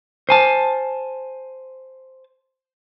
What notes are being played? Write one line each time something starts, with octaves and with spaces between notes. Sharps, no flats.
C5 G#5 A5